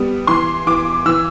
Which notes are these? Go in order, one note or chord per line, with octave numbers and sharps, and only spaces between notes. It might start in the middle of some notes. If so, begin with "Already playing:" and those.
Already playing: G3 B3
E3 C6
E3 D6
E3 E6